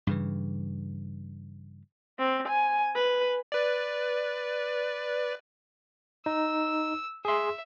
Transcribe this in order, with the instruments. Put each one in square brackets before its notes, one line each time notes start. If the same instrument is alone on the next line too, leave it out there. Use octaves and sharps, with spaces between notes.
[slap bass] G2 C#3 E3
[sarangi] C4
G#5
B4
[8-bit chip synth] B4 D5
[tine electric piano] D#4 [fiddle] E6
[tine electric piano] G#4 C6 [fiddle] E5